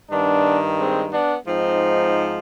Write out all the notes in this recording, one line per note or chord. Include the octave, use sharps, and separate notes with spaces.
G2 D#3 B3 D4
G#3 C4
B3 D4
G#2 F3 C4 D#4